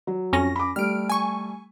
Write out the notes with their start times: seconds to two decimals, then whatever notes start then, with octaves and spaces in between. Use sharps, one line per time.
0.07 F#3
0.33 F2 C#4 A#6
0.56 B5 D6
0.76 G3 A3 F6 D7
1.10 G#5 C#6